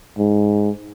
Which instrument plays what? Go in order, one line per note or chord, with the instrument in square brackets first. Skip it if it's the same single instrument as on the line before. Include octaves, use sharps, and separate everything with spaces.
[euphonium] G#2